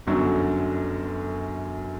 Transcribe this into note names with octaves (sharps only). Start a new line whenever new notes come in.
G1 F#2 D3 F#3